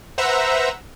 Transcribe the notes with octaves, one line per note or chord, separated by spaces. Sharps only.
B4 C5 E5 F#5 A#5 E6